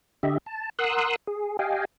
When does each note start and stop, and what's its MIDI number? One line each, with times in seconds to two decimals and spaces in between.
0.23 0.38 50
0.23 0.38 67
0.23 0.38 75
0.23 0.38 76
0.46 0.69 81
0.79 1.16 70
0.79 1.16 78
0.79 1.16 84
0.79 1.16 87
0.79 1.16 88
0.79 1.16 90
1.27 1.57 68
1.59 1.85 67
1.59 1.85 75
1.59 1.85 77
1.59 1.85 79
1.59 1.85 80